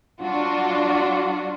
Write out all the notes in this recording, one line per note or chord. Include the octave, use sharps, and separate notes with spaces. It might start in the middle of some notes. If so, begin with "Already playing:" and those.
F#3 D4 F4 F#4